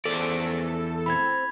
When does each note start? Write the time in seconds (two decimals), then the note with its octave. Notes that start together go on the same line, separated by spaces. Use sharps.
0.05 E2 F3 G#3 C#4 A4 D5
1.06 C4 E4 B5 G#6